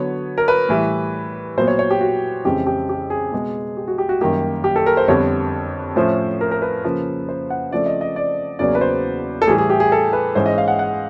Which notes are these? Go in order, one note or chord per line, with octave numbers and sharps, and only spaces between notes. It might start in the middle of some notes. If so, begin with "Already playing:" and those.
Already playing: D3 F#3 B3 C#5
A#4
B4
A2 E3 G3
A#2 F#3 B3 C5
C#5
C#5
G4
F#4
F2 C#3 E3 G#3 C4 G4
G4
G4
G#4
B2 G#3 B3
G4
F#4
G4
F#4
F#2 D#3 G3 A#3 G4
G4
A4
A#4
C5
F2 D3 G3 B3 C#5
A2 F3 A3 C#4 C5
A#4
A#4
B4
C#3 F3 A#3
C5
F#5
C#3 F3 A3 C4 D5
D#5
D#5
D5
E2 C#3 F#3 A#3 C#4 D5
B4
C5
A4
A2 E3 G3 G#4
G#4
G4
G#4
A4
B4
G#2 E3 G#3 C#4 C5
D#5
F5
F#5
F#5